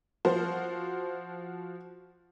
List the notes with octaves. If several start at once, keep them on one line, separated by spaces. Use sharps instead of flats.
F3 F#4 C5